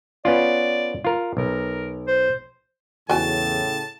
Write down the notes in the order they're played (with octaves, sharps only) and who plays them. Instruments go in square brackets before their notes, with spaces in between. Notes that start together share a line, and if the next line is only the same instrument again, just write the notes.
[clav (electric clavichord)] B3 C#4 F4 [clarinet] D5
[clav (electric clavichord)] F4 A#4
[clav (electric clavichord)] B1 [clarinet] A#4
[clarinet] C5
[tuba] E2 [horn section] A2 C#3 C#4 [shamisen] F#4 G#5 [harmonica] A5